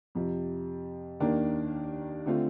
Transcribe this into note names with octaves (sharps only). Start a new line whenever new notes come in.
F2 C3 F3
D#2 D#3 A#3 D4
D3 A3 C4 F4